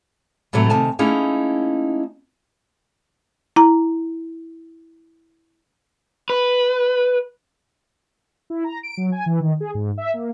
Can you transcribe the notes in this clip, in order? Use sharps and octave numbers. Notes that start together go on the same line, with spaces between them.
A2 C3 E3 F#3 A3
C3 D#3 G#5 A5
A3 A#3 C#4 D#4 E4 G#4
E4 A#5
B4
E4
A#5
D7
F#3
G#5
E3
D#3
G#4
G#2
E5
A#3